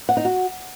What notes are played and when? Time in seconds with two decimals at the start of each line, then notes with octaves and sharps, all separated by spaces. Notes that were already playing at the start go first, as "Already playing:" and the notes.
0.09 F#5
0.17 D#4
0.25 F#4